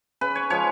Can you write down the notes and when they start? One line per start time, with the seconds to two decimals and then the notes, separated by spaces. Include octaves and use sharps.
0.21 C#3 B4
0.35 C#5
0.50 F3 G#3 C#5